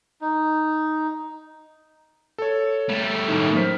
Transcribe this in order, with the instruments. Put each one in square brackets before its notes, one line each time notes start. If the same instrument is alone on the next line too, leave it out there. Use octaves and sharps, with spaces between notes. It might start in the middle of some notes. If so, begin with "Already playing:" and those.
[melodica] D#4
[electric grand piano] A4 C#5
[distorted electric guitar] G3 A3
[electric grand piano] F#2 A2 D#3
C5 F6 B6